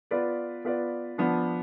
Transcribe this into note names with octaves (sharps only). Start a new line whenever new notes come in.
B3 F4 B4 D5
B3 F4 B4 D5
F3 B3 D4